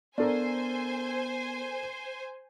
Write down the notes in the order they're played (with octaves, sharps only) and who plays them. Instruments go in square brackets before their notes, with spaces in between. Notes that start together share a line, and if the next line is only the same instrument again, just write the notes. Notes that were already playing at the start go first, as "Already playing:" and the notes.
[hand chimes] B3 [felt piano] D4 A4 A#4 [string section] C5 G#5